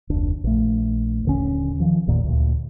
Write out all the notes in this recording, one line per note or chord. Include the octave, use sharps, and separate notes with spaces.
F1 D2 D4
A#1 A3
D#1 D3 C#4
D#3 F3
G1 D#2 A#2
D2 A#2